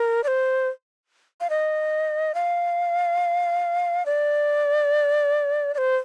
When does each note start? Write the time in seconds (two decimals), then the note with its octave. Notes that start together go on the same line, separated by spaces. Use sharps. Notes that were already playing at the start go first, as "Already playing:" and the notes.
Already playing: A#4
0.24 D5
0.28 C5
1.41 F5
1.50 D#5
2.35 F5
4.06 D5
5.74 D5
5.78 C5